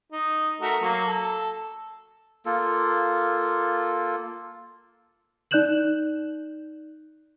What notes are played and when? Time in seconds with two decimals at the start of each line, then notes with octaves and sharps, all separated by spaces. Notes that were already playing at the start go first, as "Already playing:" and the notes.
0.12 D#4
0.61 A3 F#4 A#4
0.82 F#3 A#3
1.07 A4
2.46 A#3 F4 A4
5.51 D#4 D5 F#6 G6 E7 F#7